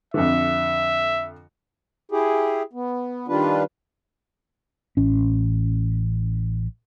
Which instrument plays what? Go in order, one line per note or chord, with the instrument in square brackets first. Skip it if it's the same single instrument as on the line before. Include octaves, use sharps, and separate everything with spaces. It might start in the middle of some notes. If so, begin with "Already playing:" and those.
[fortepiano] F2 D3 [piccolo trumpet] E5
[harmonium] E4 G4 G#4
B3
D#3 G3 D4 F4 B4
[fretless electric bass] A1 C#4